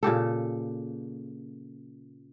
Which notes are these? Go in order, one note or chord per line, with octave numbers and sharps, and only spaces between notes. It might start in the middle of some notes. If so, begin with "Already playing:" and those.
A#2 C#3 G4 A4